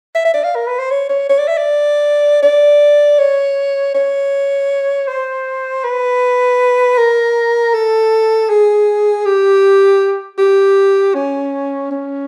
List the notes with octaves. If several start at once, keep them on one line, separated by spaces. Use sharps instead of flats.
E5
E5
D5
F5
A#4
B4
C5
C#5
C#5
C#5
D5
E5
D5
D5
C#5
C#5
C5
B4
A#4
A4
G#4
G4
G4
C#4
C#4